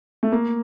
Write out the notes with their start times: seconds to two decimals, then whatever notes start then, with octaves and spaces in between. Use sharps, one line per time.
0.23 A3
0.32 A#3